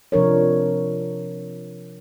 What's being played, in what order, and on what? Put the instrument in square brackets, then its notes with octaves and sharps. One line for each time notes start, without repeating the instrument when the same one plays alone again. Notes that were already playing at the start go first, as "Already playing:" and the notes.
[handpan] C3 F3 D4 A#4 C#5